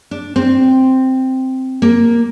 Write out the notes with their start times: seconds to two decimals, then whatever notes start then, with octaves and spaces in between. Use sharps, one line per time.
0.11 D4
0.36 C4
1.82 A#3